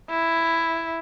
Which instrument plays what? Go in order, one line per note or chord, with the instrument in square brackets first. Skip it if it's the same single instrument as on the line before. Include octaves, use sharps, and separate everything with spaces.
[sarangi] E4